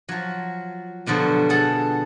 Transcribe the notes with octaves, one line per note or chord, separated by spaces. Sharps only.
F3 F#3
G2 B2 D3 F3 F#3
G#4 A4 F#5